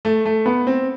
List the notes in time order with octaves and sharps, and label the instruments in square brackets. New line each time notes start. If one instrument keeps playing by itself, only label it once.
[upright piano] A3
A3
B3
C4